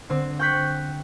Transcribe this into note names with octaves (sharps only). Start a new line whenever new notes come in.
D3 C4
G5 C#6 F#6 G6 B6